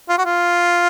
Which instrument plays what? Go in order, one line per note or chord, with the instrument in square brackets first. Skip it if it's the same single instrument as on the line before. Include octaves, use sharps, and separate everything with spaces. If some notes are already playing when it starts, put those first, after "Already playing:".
[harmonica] F4
F#4
F4